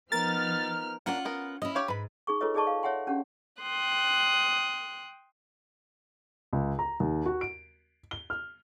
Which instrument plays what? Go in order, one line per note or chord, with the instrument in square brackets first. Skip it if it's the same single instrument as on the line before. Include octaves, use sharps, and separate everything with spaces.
[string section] F3 F6 [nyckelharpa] B3 D#4 [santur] A#4 [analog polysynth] A6
[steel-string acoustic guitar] C#4 F4 F#5 [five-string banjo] D4 A#4
[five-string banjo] B3 A#4
[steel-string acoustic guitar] C#4 E4 [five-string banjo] D#5
[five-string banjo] G4 C#5 F5
[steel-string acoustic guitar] G#2 [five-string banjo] B4 B5
[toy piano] D#4 G#4 C#6
D#4 F4 A4 B4 C#5 D#5
D#4 G#4 D5 D#5 A5 C#6
F5
C#5 E5 F#5 G#5 C6
C#4 D4 G4 F#5
[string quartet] G5 C6 D#6 F#6
[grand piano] C#2
A#5
D#2
F#4
D7
G7
F6